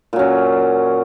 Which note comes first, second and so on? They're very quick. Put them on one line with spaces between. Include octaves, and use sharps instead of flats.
A#2 F#3 C#4